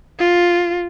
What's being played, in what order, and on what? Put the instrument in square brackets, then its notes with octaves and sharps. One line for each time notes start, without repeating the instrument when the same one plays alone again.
[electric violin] F4